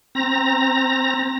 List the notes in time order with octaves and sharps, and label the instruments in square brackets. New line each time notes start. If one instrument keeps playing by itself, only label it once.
[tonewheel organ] C4 A#5 A#6